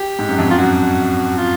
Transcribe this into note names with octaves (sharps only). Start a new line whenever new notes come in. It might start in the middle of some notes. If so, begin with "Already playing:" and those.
Already playing: G4
G#2
F#2
F2
F#2
F4
F#2 F#4
F4